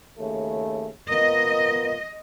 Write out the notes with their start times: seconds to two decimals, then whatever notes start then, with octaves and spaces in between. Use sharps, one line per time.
0.18 D#2 C#3 A3
1.10 B3 F4 A#4 D#5